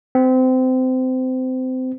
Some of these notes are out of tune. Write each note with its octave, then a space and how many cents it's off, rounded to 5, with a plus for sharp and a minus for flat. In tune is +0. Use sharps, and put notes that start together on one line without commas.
C4 -25